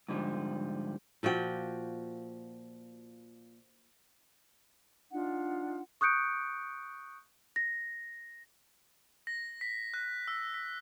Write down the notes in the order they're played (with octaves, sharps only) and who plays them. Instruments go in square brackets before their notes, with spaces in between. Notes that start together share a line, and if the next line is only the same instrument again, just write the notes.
[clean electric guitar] G#2 D3 F3 G3
[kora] A#2 F3 F#4 G5
[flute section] D4 D#4 F4 F#5
[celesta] C#6 D#6 F#6 G6 C#7 D7
A#6
[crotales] A#6
B6
F#6
E6
B6